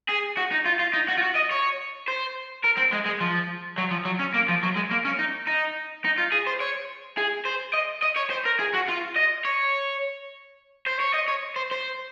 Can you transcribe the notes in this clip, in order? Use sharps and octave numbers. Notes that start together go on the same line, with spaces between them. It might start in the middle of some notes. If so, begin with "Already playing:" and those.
G#4
F#4
D#4
F4
F4
D#4
F#4
F4
F#4
D#5
C#5
C5
A#4
C4
G#3
G#3
F3
F#3
F3
F#3
C#4
A#3
F3
F#3
G#3
A#3
C#4
D#4
D#4
D#4
F4
G#4
C5
C#5
G#4
C5
D#5
D#5
C#5
C5
A#4
G#4
F#4
F4
D#5
C#5
C5
C#5
D#5
C#5
C5
C5